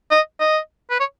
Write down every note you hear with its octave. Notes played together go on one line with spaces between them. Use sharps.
D#5
D#5
B4
C#5